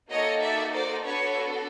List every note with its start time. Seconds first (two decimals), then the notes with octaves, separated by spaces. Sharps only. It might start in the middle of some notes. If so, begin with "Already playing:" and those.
0.10 A#3 D#4 F#4 A4 C#5 D#5
0.42 D5 E5
0.73 C5 D5
1.04 B3 D4 F#4 A4 B4 C#5